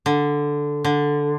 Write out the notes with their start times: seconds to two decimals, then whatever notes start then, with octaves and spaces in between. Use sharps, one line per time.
0.06 D3
0.84 D3